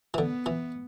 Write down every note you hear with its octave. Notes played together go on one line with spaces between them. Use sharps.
E3
D3 B3
E3